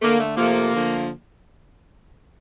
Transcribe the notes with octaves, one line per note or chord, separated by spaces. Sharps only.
D3 A3 A#3
A3
C3 F3 A3 A#3
D3 F3 A3